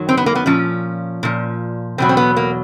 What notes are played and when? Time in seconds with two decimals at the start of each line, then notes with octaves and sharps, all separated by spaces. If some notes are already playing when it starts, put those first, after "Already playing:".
Already playing: F#2 D#3 F#3
0.09 C4
0.17 B3
0.26 A#3
0.35 B3
0.46 A#2 F3 C#4
1.23 A#2 F3
1.98 E2 B2 F#3 C4
2.09 C4
2.17 B3
2.37 A#3